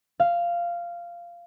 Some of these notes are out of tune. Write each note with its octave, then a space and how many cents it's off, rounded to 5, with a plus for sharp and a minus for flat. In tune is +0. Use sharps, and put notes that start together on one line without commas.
F5 -10